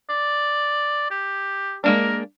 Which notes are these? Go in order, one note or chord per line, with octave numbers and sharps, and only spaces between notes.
D5
G4
G#3 A#3 D4 A#4